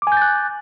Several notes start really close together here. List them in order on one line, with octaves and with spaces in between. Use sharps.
D6 G#5 G6 A6 F#6